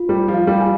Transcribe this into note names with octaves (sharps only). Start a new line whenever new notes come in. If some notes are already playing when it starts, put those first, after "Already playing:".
Already playing: F4
G3 C5
F3
F5
G3
G#5